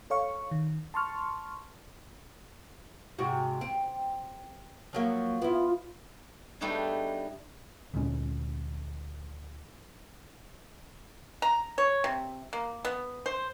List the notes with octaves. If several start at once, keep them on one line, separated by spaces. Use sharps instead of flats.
A4 C#5 F5 C#6
D#3
A5 C6 C#6 F6
G#2 C3 F#4
C4
F3 F#3 A#3
B3 E4 F4
G3 A3 B3 D4 D#4 G#4
D2 A#2 G#3 C#4
A#5
C#5
C3
A#3
B3
C5